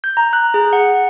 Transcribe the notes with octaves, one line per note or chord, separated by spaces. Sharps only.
G6
A#5
F#6
G#4
F#5